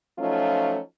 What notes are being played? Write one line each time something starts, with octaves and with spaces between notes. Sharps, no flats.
F3 F#3 A3 C#4 D#4 F4